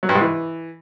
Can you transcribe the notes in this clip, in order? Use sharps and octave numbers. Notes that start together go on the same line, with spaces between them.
F#3
G2
G#2
E3